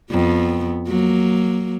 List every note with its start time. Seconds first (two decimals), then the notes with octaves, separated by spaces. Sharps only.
0.10 F2 B3
0.87 F#3 A#3